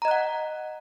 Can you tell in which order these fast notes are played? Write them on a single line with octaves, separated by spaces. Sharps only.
A#5 D#5 F#6 F#5